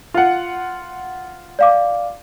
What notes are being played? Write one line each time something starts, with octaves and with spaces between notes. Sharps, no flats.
F4 F#5
D5 F5 D6